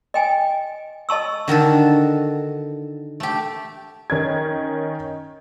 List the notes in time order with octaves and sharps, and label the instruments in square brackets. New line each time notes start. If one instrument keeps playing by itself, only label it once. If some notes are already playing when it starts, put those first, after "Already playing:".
[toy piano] D#5 G5 G#5
D#5 A5 C#6 E6
[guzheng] D3 D#3 F#4 A4
A3 G4
[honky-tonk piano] D#3 C#4 D#4 G#6